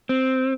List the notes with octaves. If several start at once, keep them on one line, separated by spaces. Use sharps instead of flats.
C4